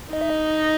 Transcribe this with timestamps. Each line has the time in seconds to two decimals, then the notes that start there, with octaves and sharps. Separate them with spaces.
0.13 D#4 D#5
0.21 E5
0.30 D#5